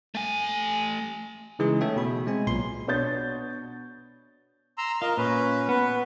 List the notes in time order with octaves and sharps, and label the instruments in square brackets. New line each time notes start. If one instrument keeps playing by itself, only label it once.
[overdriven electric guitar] A3 G#5
[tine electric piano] C#3 E3 G#3 D#4 E4 G#4
A3 A4 C#5 E5 G5
B2 B5
G#3 C4 G#5
B1 A#2 C6
[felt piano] B2 D4 C#5 D#6 G6 A6
[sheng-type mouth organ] A#5 C6 E6
[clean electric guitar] F4 [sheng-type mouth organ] A#4 D#5
[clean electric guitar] A#2 [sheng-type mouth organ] C#4 B4
[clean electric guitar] B3 [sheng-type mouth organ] B4